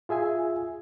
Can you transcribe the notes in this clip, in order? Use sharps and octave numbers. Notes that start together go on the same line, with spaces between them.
F4 G#4 E5 G#5